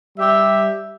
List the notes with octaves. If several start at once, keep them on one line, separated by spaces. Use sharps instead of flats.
G3 G4 E5